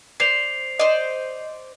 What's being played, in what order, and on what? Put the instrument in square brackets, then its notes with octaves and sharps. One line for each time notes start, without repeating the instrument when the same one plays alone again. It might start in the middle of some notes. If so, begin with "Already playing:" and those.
[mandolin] C5 D5 [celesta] C7 F7
[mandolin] C5 D5 [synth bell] D#5